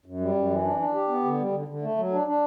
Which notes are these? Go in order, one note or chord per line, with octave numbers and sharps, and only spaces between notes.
F#2
G3
F#2
E3
D4
D4
G4
B3
D3
G3
D3
D3
A3
F#3
D4
D4